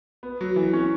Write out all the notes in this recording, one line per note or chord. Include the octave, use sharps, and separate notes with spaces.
B3
F#3
E3
C#4